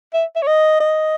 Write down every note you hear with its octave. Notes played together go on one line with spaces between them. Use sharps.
E5
E5
C#5
D#5
D#5